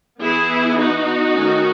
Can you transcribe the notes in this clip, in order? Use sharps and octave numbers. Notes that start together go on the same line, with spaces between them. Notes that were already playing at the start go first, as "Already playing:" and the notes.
E3 B3 E4 G#4
D#4 F#4
D#3 A3 C#4